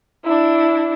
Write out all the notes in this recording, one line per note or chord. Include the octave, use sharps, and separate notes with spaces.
D4 E4